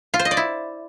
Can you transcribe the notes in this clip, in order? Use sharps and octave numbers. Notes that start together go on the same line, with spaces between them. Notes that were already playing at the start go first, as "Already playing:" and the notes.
F4
C5
D#5
D5
E4